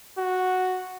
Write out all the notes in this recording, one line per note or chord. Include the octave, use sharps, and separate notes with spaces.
F#4